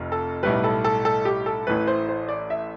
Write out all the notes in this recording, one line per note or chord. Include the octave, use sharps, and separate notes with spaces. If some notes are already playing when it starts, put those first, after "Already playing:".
Already playing: F1 F2
A4
B1 A2 G3 B4
A4
A4
A4
G4
A4
A1 A2 E3 A3 B4
C5
C5
D5
E5